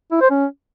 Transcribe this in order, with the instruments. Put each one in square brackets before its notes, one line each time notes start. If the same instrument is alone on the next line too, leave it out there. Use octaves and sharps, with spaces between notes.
[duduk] E4
C5
C#4